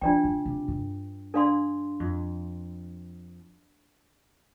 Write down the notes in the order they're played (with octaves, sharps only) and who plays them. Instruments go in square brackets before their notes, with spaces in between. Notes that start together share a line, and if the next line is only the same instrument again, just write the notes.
[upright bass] F3 [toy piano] D4 F4 D5 G5
[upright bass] D3
C3
G2
[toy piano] D4 A4 D5 F5 C6
[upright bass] F2